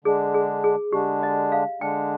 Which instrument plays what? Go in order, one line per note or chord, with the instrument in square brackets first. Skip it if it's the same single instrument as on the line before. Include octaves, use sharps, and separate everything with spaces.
[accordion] D3 G#3 D4 [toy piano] G#4
[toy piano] G#4
G#4
[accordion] D3 G#3 D4 [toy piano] G4
[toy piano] D#5
F5
[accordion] D3 G#3 D4 [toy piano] G5